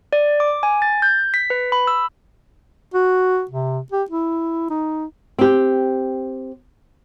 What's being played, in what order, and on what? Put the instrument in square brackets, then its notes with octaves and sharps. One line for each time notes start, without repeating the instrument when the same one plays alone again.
[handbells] D5
D6
G#5
A6
G6
B6
B4
B5
E6
[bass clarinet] F#4
C3
G4
E4
D#4
[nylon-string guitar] C4 G4